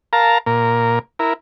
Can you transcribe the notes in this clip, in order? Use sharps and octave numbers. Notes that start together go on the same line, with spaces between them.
A#4 F5 A5 A#5
A#2 A#4
E4 A#4